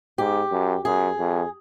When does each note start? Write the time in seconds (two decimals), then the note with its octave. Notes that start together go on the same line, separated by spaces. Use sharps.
0.18 G#2 G4
0.52 F#2
0.85 F#2 G#4
1.19 F2